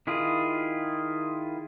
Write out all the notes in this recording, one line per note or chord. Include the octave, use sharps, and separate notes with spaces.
D#3 E4 F4 G#4